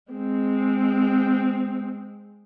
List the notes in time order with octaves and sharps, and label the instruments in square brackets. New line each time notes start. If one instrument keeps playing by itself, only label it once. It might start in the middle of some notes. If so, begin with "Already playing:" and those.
[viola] G#3 C4